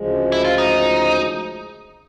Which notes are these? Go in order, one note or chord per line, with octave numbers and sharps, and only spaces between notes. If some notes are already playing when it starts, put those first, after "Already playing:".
Already playing: D2 C#3 F3 G#3
E4
F4
D#4